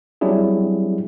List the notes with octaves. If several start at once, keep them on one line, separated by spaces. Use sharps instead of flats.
F#3 G3 C4 D4 E4 G#4